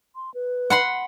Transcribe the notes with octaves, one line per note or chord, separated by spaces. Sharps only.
C6
B4
F#5 B5 C6